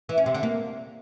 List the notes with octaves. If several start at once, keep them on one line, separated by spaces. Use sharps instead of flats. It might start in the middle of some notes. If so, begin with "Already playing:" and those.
E3
C#4
C3
D3
A#3